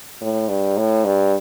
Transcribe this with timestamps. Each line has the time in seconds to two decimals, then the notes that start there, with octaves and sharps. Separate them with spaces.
0.21 A2
0.48 G2
0.77 A2
1.05 G2